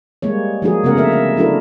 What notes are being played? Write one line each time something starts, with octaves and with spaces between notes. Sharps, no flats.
G3 G#3 A#3 C#5
F3 G#3 A#3 D#4 F#4 G#4
C#3 G#3 A3 B3 A#4 F#5
D3 A#3 A#4 E5
E5
F#3 D4 E4 F#4 A4 A#4